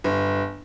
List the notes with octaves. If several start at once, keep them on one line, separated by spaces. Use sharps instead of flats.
G1